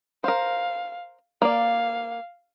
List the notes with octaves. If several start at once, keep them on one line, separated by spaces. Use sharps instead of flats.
A#4 C5 F5
A#3 D5 F5